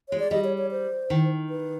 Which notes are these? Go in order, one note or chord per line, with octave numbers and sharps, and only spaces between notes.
G#3 C#5
D5
G3 D#5
C#5
C#5
C5
D#3
B4